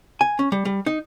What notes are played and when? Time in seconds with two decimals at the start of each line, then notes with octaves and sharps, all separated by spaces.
0.21 G#5
0.39 C#4
0.52 G3
0.65 G3
0.86 D#4